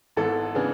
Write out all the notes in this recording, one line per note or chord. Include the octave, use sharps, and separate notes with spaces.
G#1 G#2 E3 B3 A4
C#3 E3 B3 D4 G#4